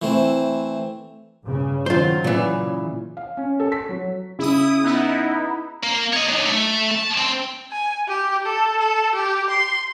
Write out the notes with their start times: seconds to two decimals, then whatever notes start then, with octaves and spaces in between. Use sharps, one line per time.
0.02 E3 A3 C4
1.45 G2 C#3
1.86 D#3 F#3 F4 C5
2.24 A#2 C#3 E3
3.17 F5
3.37 C#4
3.60 A4
3.72 B6
3.89 F#3
4.39 C#3 E4 D#6
4.84 B3 D#4 E4
5.83 A#3
6.13 C#5 D#5
6.29 F#3 D#4
6.46 A3
6.91 A5
7.18 C4
7.72 G#5
8.08 G4
8.46 A4
8.80 A4
9.15 G4
9.50 C6